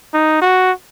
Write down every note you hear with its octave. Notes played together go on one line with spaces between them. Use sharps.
D#4
F#4